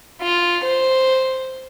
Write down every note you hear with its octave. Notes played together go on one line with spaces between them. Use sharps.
F4
C5